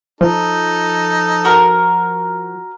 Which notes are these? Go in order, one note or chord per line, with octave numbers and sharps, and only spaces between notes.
F3 D#4 A4
F#4 A#4